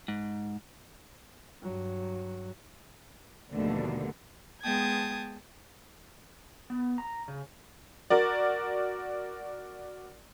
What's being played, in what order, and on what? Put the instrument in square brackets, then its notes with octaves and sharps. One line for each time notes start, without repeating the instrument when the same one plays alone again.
[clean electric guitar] G#2
[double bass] G2 F#3
[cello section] D#2 G#2 B2 D3 F3 A3
[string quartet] G#3 B3 G5 A5 D#6 G#6
[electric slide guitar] B3
A#5
C#3
[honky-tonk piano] F#4 A#4 D5